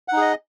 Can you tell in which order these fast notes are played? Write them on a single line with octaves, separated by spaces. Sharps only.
F#5 D#4 G#4 D#5